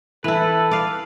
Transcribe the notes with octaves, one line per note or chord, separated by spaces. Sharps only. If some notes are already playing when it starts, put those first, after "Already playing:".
E3 E4 A4 B4
D5 F5